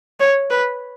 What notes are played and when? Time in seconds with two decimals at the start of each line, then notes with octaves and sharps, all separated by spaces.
0.20 C#5
0.50 B4